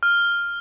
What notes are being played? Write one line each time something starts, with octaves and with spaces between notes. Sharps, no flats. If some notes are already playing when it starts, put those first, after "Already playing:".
F6